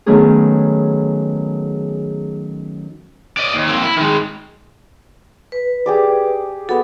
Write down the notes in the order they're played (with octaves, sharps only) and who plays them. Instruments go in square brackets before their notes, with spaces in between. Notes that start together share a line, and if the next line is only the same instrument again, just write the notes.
[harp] D#3 F#3 A3 B3 C#4 G#4
[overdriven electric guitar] D5 D#5
D#2
A#3 C4
E4
D#3 G#3
[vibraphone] B4
[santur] G4 G#4 D5
[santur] B3 F#4 [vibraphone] A4